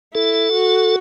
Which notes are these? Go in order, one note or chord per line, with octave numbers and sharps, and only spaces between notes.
E4 A4
F#4